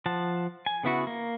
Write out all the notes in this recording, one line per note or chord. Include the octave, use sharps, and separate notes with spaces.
F3 F#5 A5
G#5
C#3 B3 E4 F#4
A#3